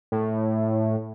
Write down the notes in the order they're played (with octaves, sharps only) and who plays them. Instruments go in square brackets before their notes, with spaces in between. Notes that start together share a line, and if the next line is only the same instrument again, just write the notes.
[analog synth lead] A2